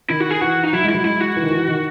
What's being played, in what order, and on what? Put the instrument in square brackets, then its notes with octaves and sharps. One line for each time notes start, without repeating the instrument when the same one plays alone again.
[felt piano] D#3 [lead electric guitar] E4
[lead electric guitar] F#4
G#4
[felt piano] E3 [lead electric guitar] F#4
[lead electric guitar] D#4
[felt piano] F#3 [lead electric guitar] E4
[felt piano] G#3
[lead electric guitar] E4
[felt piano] F#3
[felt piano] G#3 [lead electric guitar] E4
[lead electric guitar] F#4
[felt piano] E3
D#3
E3
D#3